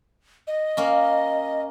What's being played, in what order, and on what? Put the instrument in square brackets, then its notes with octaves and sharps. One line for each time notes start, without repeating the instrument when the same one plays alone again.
[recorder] D#5
[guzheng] A#3 C#4